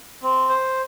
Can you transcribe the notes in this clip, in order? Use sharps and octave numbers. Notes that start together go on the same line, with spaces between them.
C4
C5